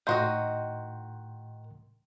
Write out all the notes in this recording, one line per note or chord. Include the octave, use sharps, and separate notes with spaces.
A2 D#3 F#4 D#5 C6 G6